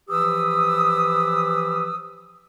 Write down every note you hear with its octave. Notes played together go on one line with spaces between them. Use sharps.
E3 F3 G4 B4 D#6 E6